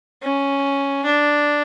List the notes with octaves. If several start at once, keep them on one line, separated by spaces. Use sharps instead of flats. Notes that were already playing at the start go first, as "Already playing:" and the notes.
C#4
D4